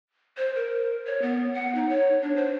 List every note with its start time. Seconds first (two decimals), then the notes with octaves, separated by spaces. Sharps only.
0.37 C5
0.56 A#4
1.05 C#5
1.22 B3
1.54 F#5
1.75 D#4
1.89 C#5
2.22 D4
2.36 C5